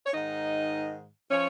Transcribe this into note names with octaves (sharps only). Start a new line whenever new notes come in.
C#5
G#2 D#3 D#4 D#5
F3 C#4 C#5